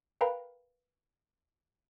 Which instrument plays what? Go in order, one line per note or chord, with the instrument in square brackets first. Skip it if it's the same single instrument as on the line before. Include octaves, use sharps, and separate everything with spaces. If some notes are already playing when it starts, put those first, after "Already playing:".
[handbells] A#4 B4 F5 G5 A#5 B5